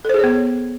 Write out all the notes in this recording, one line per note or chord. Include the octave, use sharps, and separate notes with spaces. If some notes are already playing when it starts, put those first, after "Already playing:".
B3 G#4 A4 C5 C#5